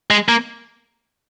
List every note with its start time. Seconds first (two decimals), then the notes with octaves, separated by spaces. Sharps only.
0.11 G#3
0.29 A#3